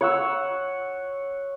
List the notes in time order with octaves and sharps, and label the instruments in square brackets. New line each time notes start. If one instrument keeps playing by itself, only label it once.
[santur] C#5 F#5 E6